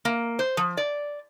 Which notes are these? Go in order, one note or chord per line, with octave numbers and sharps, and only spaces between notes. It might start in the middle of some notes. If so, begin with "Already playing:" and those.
A#3
C5
F3
D5